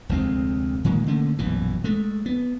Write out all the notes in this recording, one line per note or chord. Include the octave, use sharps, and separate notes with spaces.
F1 D2 G#3 C4
A#2 D#3 G#3 A#3
D3 A3 A#3 C#4
A#1 F#2 B2 E3
G#3 A3
B3